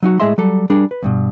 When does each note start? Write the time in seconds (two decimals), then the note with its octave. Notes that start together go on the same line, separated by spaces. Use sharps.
0.03 F#3 D#4 F#4
0.20 A2 G#3 G#4 D#5 E5 C6
0.38 F#3 G3 A4
0.70 G3 D4 G#4 A#4
0.91 B4
1.03 E2 G2 B2